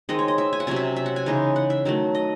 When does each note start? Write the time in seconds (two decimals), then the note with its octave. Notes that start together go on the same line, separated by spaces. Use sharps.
0.09 D#3 G#3 C4 D#5
0.19 C#5
0.28 D#5
0.38 E5
0.53 G#5
0.60 F#5
0.67 C3 F#3 C#4 G#5
0.76 E5
0.96 E5
1.06 F#5
1.16 G#5
1.26 C#3 E3 G#3 D#4
1.56 F#5
1.70 E5
1.85 D#3 F#3 A3
2.15 D#5